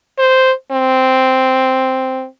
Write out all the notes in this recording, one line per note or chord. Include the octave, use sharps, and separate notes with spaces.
C5
C4